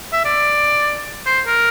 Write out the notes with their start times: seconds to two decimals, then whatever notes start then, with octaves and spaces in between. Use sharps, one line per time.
0.13 E5
0.25 D5
1.26 C5
1.47 A#4